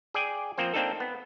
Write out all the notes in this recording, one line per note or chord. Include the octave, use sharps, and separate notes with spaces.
G#4 D5 G5 G#5
F3 A#3 C4 C5
A#3 C4 D4 D#4 A4
B3